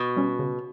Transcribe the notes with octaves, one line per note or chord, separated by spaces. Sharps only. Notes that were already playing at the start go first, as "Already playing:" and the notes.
Already playing: B2
G3 C#4
C#3